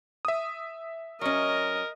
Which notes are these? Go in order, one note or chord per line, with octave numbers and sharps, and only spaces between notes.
E5 D#6
F#3 C#4 A#4 D#5